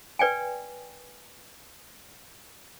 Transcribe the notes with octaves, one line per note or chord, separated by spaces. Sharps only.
B4 D5 G5 G#5